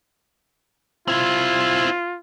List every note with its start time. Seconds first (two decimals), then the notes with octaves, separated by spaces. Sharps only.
1.08 C4 E4 F4